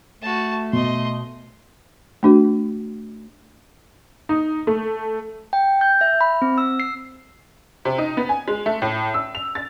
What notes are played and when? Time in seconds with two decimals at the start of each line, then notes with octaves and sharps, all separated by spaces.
0.22 A3 F#4 A5
0.73 B2 D#5 C6
2.23 A3 D4 F#4
4.29 D#4
4.67 A3
5.53 G5
5.81 G6
6.01 E5
6.21 B5
6.42 C4
6.58 E6
6.80 C7
7.85 C3
7.98 D#4
8.17 B3
8.29 G#5
8.48 G#3
8.66 A3
8.82 A2
9.14 E6
9.35 F7
9.55 A6